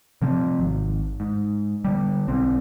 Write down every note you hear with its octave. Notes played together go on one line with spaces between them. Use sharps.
C3 F3 C4
G#1
G#2
D3 G3
B1 C4